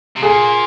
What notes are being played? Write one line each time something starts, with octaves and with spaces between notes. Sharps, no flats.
C3
A#2 G#4